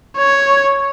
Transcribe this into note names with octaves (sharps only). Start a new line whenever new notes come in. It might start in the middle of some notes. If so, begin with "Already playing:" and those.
C#5